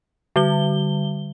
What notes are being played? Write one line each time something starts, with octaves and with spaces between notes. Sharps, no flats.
D3 G3 G7